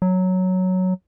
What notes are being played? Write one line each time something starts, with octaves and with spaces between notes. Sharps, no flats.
F#3